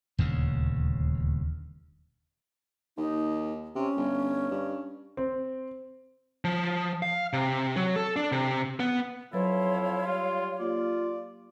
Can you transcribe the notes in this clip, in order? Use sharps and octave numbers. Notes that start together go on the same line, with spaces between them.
D#1 D2 C#3
D#2 D#4
C3 C#4
G1
G2
C4
F3
F5
C3
F#3
A4
D4
C3
B3
F2 F#3 E4 B4 C#5 F5 C6
G3 F4
A#3 F4 G4 D5